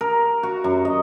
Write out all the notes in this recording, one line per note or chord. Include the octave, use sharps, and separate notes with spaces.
A#4
F#4
F#2
D#5